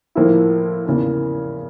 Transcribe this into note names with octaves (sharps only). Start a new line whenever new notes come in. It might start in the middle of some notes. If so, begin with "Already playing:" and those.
A2 F3 A#3 E4
E2 C#3 E3 A#3